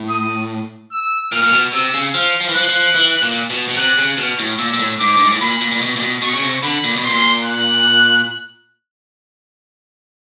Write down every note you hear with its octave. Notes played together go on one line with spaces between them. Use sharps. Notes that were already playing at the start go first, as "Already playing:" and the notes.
Already playing: A2
D#6
E6
A#2 F6
A#2
B2
C3 E6
C#3
F3 F6
F3
E3
F3 F#6
F3
E3
A#2
B2
B2
C3 F#6
C#3
B2 F6
A2
A#2 E6
A#2
A2
G#2 D6
G2
G#2
A2
A#2 B5
A#2
A#2
B2
A#2
B2
B2 C#6
C#3
C3
D3 B5
A#2
B2
C6
A#2
F#6